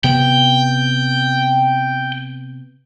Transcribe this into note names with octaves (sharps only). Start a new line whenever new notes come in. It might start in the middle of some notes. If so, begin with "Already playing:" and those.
C3 B3 G5